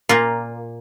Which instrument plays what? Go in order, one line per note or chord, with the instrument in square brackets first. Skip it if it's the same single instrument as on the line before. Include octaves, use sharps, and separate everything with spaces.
[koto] A#2 A#3 F4